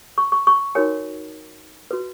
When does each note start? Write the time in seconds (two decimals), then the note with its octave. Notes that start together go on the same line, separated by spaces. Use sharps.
0.18 C#6
0.32 C#6
0.47 C#6
0.75 D#4 F#4 A#4 C#5 G#5
1.91 F#4 B4